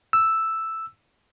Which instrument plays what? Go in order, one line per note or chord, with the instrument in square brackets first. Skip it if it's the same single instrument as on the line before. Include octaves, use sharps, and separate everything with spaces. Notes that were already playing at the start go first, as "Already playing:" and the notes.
[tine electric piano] E6